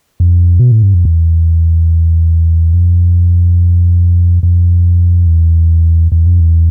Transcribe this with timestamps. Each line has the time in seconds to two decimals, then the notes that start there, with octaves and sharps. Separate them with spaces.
0.20 F2
0.60 B2
0.72 A2
0.83 G2
0.94 F2
1.05 E2
2.73 F2
4.43 F2
5.27 E2
6.12 E2
6.26 F2
6.40 E2